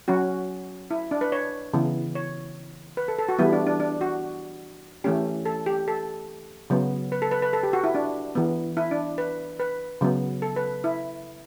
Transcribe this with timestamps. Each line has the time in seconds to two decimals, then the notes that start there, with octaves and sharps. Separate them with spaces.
0.08 F#3 C#4 F#4
0.91 E4
1.11 D4
1.21 B4
1.32 C#5
1.73 C#3 E3 B3
2.15 C#5
2.97 B4
3.08 A4
3.18 A4
3.29 F#4
3.39 E3 G3 B3 E4
3.53 D4
3.67 D4
3.80 D4
4.01 F#4
5.04 E3 A3 C#4 G4
5.46 A4
5.66 G4
5.88 A4
6.70 C#3 F#3 B3
7.12 B4
7.22 A4
7.31 B4
7.42 B4
7.53 A4
7.63 G4
7.73 F#4
7.84 E4
7.95 D4
8.35 E3 B3
8.77 E4
8.91 D4
9.18 B4
9.60 B4
10.01 C#3 F#3 B3
10.42 A4
10.56 B4
10.84 E4